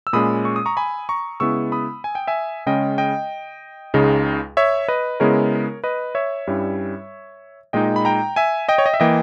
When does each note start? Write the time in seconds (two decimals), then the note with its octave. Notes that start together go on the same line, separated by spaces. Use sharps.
0.07 E6
0.13 A#2 G#3 C#4 B5 D#6
0.45 C#6
0.56 D#6
0.66 A#5 C#6
0.77 G#5 B5
1.09 A#5 C#6
1.40 C#3 G#3 B3 E4 C#6 E6
1.72 B5 D#6
2.04 G#5
2.15 G5
2.27 E5 G#5
2.66 C#3 G#3 C#4 D#5 G5
2.98 D#5 G5
3.94 C#2 C#3 G#3 D#4
4.57 C#5 E5
4.88 B4 D#5
5.20 C#3 G#3 B3 E4 A#4 C#5
5.84 B4 D#5
6.15 C#5 E5
6.47 G2 G3 C#4 E4
7.73 A#2 G#3 D#4 D#5 G5
7.96 B5
8.05 G5 A#5
8.36 E5 G#5
8.69 D#5 G5
8.78 C#5
8.86 D#5
8.94 E5
9.00 E3 A#3 D#5 G5